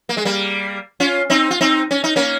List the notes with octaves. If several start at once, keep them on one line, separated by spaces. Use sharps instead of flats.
A#3
G#3
G3 A#3
C#4 F4
C4 D#4
F4
C4 D#4
C#4
D#4
A#3 C#4